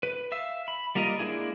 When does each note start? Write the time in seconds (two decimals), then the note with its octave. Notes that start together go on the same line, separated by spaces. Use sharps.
0.03 B4
0.32 E5 F5 E6
0.68 B5
0.95 G3 A#3 F4 A#4 D#5
1.19 G#3 A#3 D4 E4 G#4